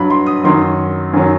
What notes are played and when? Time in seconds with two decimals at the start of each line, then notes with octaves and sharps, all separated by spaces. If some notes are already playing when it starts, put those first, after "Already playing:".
Already playing: G2 F#3 B5
0.10 C6
0.26 D#6
0.44 F#2 D#3 F#3 C6
1.13 F#2 D#3 F#3